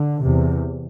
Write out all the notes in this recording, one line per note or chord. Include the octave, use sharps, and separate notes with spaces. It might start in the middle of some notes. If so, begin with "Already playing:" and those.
Already playing: D3
E2 C3